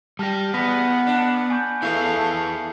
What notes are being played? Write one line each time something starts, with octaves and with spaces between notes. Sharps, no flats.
G3 G4 A5 F6 A#6
E2 B3 F#5 B5 A#6 B6
D4 F#6
G#5 C#6 G6
A3 E4 G#4 B4 F5